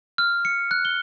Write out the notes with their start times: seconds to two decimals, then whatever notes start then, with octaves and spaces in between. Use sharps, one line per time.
0.18 F6
0.45 C#7
0.71 F#6
0.85 G7